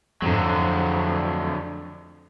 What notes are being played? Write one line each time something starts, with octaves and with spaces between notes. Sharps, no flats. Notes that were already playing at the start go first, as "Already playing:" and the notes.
F2 D3 F#3